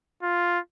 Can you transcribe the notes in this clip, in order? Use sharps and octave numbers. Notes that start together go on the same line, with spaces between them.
F4